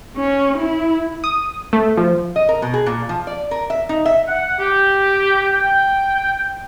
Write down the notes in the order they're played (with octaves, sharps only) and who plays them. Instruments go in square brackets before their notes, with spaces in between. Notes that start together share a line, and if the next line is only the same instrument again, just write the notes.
[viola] C#4
E4
[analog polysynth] D#6
A3
F3
[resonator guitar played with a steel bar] D#5
A#4
B2
G#4
A#2
F3
D5
A#4
E5
D#4
E5
[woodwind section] F#5
G4
G5